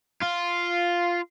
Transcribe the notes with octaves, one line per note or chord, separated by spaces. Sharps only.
F4